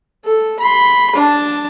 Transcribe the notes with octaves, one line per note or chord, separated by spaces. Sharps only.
A4
B5 C6
D4 A5